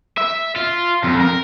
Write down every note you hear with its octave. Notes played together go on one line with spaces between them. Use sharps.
E5
F4
F2
A#4